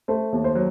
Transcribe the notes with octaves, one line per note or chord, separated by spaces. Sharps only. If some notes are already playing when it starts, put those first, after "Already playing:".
A3 C5
D#2
C5
F#3